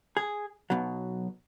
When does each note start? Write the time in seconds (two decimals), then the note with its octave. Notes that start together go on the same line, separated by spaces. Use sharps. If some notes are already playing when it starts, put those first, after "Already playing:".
0.17 G#4
0.70 B1 B2 F#3